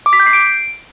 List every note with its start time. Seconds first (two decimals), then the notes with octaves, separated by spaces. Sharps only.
0.06 D6
0.13 B6
0.20 G6
0.26 C7
0.33 D7